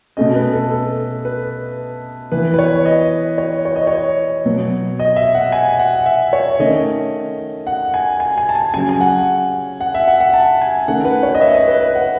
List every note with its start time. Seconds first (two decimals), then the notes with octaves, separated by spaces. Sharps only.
0.17 B2 A3 C#4 D#5
0.35 B4
0.53 A4
0.71 A4
1.25 B4
2.32 E3 B3 B4
2.54 B4
2.59 C#5
2.85 D#5
3.38 C#5
3.65 C#5
3.76 D#5
3.87 C#5
4.45 B2 F#3 B3
4.99 D#5
5.16 E5
5.35 F#5
5.52 G#5
5.79 F#5
6.06 E5
6.33 C#5
6.59 D#3 A3 C#4 D#5
7.67 F#5
7.94 G#5
8.20 G#5
8.38 G#5
8.49 A5
8.55 G#5
8.74 C#3 F#3 C#4 G#5
8.89 G#5
9.01 F#5
9.81 F#5
9.94 E5
10.08 F#5
10.20 F#5
10.34 A5
10.62 G#5
10.88 D#3 A3 C#4 F#5
11.05 B4
11.23 C#5
11.35 D#5
11.41 E5
11.55 D#5
11.68 B4
11.81 B4
11.95 F#5